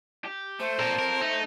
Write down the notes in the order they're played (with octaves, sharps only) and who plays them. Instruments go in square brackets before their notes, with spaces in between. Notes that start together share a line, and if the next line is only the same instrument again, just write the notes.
[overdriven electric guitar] G4
[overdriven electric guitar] A3 [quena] C5
[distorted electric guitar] A#2 A#4 [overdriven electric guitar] C4 A4
[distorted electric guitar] A#4
[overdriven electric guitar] A3 [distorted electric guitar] D#4